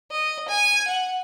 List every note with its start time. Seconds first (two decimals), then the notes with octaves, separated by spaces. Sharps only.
0.11 D#5
0.48 G#5
0.87 F#5